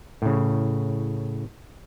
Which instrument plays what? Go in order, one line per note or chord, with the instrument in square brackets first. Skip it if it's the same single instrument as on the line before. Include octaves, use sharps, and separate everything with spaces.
[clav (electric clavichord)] A2 C#3